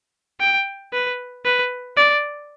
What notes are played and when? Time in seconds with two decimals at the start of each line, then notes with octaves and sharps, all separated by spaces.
0.40 G5
0.93 B4
1.45 B4
1.97 D5